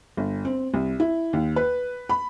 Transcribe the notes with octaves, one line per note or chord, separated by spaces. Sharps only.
G1
C4
C2
E4
D#2
B4
B5